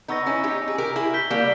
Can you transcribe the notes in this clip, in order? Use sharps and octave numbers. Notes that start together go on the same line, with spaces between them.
B3 D#4 A#5 C#6 E6 A#6
C#4 E4
D#4 G4
G#4
G4 A#4
E4 G#4
G6 B6 G7
G3 A#3